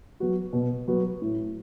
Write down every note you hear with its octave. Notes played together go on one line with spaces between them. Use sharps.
F#3 B3 F#4
B2
F#3 B3 F#4
A2